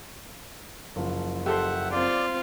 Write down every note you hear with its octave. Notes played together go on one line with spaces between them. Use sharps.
F#1 F3
G4 A4 C5 E5 F#5
C4 F4 D5